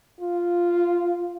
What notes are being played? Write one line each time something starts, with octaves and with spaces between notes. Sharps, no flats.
F4